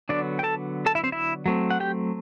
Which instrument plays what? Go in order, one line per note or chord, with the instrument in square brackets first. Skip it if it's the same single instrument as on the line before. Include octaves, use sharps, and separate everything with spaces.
[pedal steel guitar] D3 F#3 B3 D4 D5
G5
A4 A5
A4 A5
E4 E5
C4 C5
E4 E5
F#3 A3 C4
F#5
G4 G5